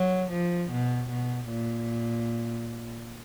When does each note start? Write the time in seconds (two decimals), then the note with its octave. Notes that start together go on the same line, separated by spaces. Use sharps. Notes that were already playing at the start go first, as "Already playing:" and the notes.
Already playing: F#3
0.32 F3
0.71 B2
1.10 B2
1.49 A#2